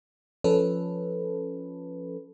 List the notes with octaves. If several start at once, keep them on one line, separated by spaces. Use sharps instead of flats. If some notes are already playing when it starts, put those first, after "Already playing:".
F3 C#4 A4 B4